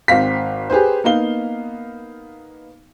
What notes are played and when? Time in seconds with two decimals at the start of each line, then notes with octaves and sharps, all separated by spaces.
0.08 G#1 C4 F5 B6
0.70 G4 G#4 B4 C5
1.04 A#3 B3 D#4 F5 G7